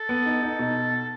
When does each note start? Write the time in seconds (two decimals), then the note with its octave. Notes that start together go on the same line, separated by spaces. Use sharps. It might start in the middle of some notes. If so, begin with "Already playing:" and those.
Already playing: A4
0.09 B3
0.26 D#4
0.43 D#4
0.59 B2